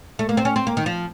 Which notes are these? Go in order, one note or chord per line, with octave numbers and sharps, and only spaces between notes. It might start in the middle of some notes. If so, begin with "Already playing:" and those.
A3
A#3
C4
C#4
C4
A#3
D#3
F3